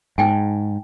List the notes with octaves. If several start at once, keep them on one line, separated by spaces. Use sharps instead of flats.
G#2 D#4 G5 G#5